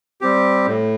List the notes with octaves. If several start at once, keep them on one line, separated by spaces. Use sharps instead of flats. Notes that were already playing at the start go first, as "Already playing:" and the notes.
G3 C4 G4
A2